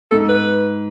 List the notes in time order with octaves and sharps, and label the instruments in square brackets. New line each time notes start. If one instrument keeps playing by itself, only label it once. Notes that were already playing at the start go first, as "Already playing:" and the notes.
[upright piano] G#2 [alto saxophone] A4
[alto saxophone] B4